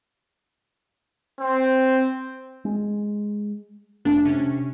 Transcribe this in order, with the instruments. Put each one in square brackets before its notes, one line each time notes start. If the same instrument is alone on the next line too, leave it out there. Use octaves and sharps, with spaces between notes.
[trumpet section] C4
[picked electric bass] G#3
[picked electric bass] E1 F2 A3 [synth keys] D4
[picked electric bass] C3 [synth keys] C#4